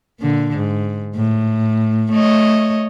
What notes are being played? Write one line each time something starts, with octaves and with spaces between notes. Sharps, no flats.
A#2 D3
G#2
A2
A3 C#5 D#5